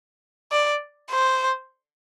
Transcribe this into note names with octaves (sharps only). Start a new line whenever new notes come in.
D5
C5